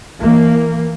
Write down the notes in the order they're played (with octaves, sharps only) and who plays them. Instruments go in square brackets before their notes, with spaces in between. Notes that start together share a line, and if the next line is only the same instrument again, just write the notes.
[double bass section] E3 A#3